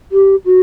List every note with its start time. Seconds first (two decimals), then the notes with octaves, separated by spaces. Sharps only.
0.12 G4
0.45 F#4